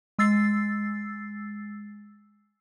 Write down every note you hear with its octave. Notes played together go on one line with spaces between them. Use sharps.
G#3 E6 A6 C7